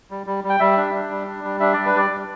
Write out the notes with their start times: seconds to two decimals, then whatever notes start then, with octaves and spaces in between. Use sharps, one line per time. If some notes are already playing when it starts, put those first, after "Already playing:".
0.11 G3
0.27 G3
0.44 G3
0.49 G5
0.60 G3 E5
0.77 D4
0.94 D4
1.11 G3
1.27 D4
1.44 G3
1.60 D4 E5
1.73 G3 D5
1.86 B4
1.95 G3 D5
2.10 G3